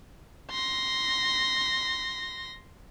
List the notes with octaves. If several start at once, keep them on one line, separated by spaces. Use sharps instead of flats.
C6 A#6